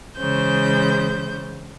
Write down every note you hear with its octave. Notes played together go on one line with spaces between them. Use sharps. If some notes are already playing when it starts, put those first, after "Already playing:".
C#3 E3 G#3 C5 G6